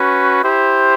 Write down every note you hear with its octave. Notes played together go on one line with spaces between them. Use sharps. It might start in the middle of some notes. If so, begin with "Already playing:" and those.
Already playing: C#4 F#4 B4
E4 G4 C5